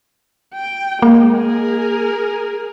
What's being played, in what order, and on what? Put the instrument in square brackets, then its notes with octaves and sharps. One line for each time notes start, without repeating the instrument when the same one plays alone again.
[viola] G5
[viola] G#3 [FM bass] A#3
[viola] G#4 A#4